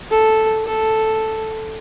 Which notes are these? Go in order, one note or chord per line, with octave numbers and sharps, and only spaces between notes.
A4
A4